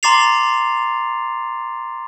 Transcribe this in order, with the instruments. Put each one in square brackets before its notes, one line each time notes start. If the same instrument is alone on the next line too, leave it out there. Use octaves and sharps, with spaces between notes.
[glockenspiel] A#5 C6 D6 A6 C7 F7